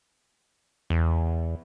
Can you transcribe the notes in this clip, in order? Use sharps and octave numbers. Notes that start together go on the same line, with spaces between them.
E2